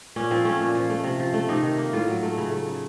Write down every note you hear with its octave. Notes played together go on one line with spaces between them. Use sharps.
A#2 C#4
F3 C4
A3 C#4
A#2
F3
A3
C3
F3
A3
C3 D#4
D#3
A#3
A2 F4
F#3
A3
C#3
A3
C#3